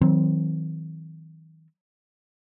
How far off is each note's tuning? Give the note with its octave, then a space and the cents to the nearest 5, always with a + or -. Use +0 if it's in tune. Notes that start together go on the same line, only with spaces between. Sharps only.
D#3 +45 F#3 -5 C4 +0